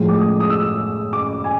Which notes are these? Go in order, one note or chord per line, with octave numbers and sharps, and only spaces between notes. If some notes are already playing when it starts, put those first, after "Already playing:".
Already playing: A2 F3 G#3
D6
D#6
D#6
E6
D6
G#5